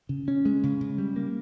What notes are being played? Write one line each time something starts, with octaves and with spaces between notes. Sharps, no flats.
C#3
C#4
G#3
C#3
C#3
G3
A#3